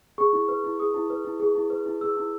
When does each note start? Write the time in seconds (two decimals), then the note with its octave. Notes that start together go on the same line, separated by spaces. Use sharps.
0.18 G#4 C#6
0.33 E4
0.48 B4
0.64 E4
0.79 G#4 D#6
0.94 E4
1.10 B4
1.25 E4
1.40 G#4
1.55 E4
1.70 B4
1.86 E4
2.01 G#4 E6
2.17 E4